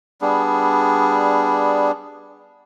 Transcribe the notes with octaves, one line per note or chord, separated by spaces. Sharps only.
G3 B3 D4 G#4